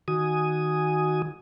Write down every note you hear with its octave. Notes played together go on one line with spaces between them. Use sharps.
D#3 F#4 G#5 D#6